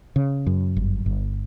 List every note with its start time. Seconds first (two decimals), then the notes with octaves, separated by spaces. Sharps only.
0.16 C#3
0.46 F#2
0.76 G1
1.06 G1